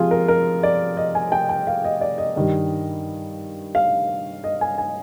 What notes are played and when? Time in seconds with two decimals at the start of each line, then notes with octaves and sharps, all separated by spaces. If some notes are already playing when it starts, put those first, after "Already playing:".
Already playing: C3 F3 G#3 F4 G#4
0.11 A#4
0.28 A#4
0.63 D5
0.97 D#5
1.15 G#5
1.32 G5
1.49 G5
1.67 F5
1.84 D#5
2.01 D5
2.18 D#5
2.36 G2 D#3 G3
3.75 F5
4.44 D#5
4.61 G#5
4.78 G#5